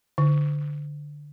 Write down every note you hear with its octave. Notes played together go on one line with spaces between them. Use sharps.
D3